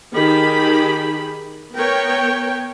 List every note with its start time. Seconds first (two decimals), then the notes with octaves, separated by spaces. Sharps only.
0.14 D#3 G4 G#4 B5
1.76 B3 A#4 C#5 G5